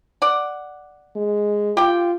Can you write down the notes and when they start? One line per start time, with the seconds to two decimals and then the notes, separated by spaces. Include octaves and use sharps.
0.22 D5 F#5
1.16 G#3
1.77 F4 G4 G5